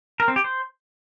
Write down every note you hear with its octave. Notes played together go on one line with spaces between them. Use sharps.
A#4
C4
G4
C5